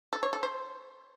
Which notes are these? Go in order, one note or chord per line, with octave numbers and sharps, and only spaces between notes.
A4
C#5
A4
C5